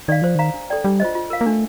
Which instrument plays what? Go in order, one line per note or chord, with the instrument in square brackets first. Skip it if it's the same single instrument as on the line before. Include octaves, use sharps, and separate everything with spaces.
[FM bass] D#3 [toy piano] D5 F5
[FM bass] F3 [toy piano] C5
[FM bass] D#3 [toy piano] F5 A#5
[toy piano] D4
A4 D5 G5
[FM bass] G3 [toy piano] D4
[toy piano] F4 C5 D#5
F4
A#4 F5
[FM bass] A#3
[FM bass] A3 [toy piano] D4